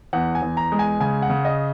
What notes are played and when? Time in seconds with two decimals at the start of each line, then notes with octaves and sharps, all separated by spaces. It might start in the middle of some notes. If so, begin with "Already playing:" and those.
0.13 E2 F#5
0.35 G#5
0.42 E2
0.57 A#5
0.72 G#3
0.79 G#5
1.00 C#3 G#5
1.22 F#5
1.29 C#3
1.45 D#5